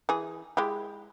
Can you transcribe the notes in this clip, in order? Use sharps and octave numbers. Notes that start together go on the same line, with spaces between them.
E3 G#4
G#3 E4 G4